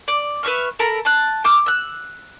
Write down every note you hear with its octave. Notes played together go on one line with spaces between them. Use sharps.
D5
B4 E5 C#6 F6
A4 A#4 A#5 B5
A5 F#6
G5 D6 E6 F6
E6 F#6